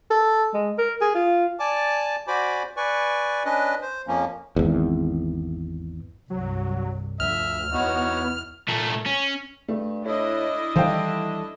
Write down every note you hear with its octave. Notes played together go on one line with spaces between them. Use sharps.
A4
G#3
A#4
G#4
F4
D5 G#5 A5 D6
F#4 C5 D5 G#5 B5 D6
B4 D5 G#5 C#6
C#4 D4 B4 D#5
C5
F2 F3 A#3 C#4
G#1 E2
C2 G2 F#3
D2 F3 E5 F6
E2 B3 D#4 E4 F#4 C#5
A#2 A3
C#4
G2 A3
A2 D4 E4 D#5
D#3 E3 G3 A3 C5 F5 G5